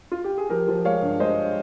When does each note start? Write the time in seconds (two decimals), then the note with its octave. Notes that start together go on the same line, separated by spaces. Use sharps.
0.12 F4
0.24 G4
0.38 G#4
0.49 F3 G4 A#4
0.68 F3
0.85 G#3 C#5 F5
1.02 G2
1.20 G#3 C5 D#5